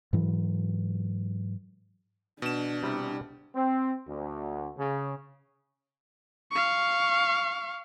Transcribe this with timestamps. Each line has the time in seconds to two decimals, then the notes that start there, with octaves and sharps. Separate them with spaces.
0.13 G#2 E3 F#3
2.42 B2 D4 E7
2.83 C3 G3 E4
3.55 C4
4.08 D2
4.78 C#3
6.52 F5 C#6